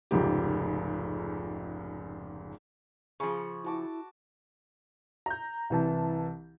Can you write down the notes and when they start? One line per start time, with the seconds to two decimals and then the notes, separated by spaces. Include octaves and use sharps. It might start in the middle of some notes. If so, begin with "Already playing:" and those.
0.11 F1 C#2 G#2 G4
3.20 C#3 F3 G#4 C#6
3.65 E4 F#4 A5 D6
5.26 A#5 G6
5.70 C2 E3 A5